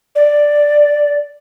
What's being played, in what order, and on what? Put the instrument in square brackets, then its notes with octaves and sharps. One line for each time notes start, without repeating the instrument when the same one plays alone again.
[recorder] D5